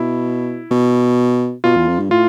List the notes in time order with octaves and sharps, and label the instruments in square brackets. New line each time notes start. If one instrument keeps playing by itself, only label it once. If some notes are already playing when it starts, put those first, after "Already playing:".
Already playing: [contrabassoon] B2 [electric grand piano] E4
[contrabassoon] B2
[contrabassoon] B2 [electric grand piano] F4
[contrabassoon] E2
F2
G2
[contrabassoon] A2 [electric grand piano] F4